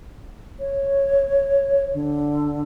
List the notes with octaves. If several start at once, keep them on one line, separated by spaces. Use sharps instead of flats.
C#5
D3